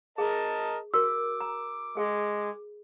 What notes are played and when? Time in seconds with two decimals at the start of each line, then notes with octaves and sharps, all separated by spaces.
0.18 G#4 A#4 D#5 A5
0.94 F#4 A#4 D6 E6
1.41 A#5
1.97 G#3 G#4